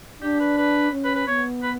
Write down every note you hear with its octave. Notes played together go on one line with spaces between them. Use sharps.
D4 G4
B4
B4
C#4
B4
B4
B3 C#5
B4